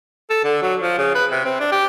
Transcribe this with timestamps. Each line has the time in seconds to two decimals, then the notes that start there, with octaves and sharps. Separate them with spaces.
0.30 A4
0.44 D3
0.62 F#3
0.80 F3
0.98 C#3
1.15 B4
1.31 C3
1.45 C4
1.60 D4
1.72 G4